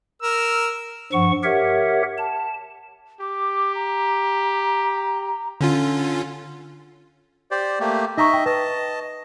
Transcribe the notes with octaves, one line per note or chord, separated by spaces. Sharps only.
A#4 E6
G2 F3 F#5 C#6
G4 A#4 C#5 E5 F#5
A5
G4 D6
A#5
D3 C#4 F4
G4 C5 D5
A3 A#3 G4
D#4 D#5 E5 A#5 C#6
G5
B4 D#5 A5